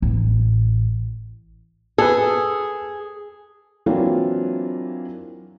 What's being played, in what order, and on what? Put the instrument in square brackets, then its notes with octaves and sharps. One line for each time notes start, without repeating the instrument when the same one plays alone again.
[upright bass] A1
[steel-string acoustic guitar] G#4 [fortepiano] A4 B4
[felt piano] E3 F#3 A#3 C4 D4 F4